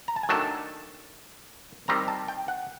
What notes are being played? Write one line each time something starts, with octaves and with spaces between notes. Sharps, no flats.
A#5
A5
G#5
D#3 F#3 A3 D4 A5
D#3 G3 C4 A#5
A5
G5
F#5